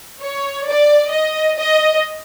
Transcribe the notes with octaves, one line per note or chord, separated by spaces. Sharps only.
C#5
D5
D#5
D#5